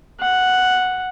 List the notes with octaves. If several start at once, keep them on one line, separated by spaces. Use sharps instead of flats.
F#5